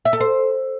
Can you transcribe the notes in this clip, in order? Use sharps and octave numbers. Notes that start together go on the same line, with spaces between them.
E5
A4
C5